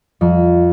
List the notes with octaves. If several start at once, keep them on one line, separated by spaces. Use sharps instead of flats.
F2